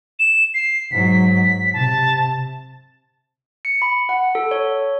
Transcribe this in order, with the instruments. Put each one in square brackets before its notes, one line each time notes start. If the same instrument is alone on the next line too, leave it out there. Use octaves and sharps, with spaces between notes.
[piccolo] E7
C7
[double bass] G#2 F#3 [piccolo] B6
[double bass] C3 [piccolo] A5
[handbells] C#7
B5
F#5
A4
C#5